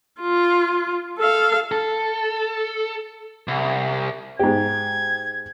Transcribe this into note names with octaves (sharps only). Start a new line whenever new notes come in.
F4
A4 F5
A4
C2
G#2 G4 G#6